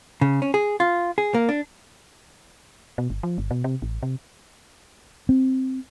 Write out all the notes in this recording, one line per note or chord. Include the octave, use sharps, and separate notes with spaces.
C#3
C#4
G#4
F4
G#4
A#3
D4
B2
G1
F3
G1
B2
C3
A1
C3
C4